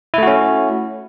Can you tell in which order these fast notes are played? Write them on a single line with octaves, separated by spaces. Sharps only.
E4 A3 F#4 C#4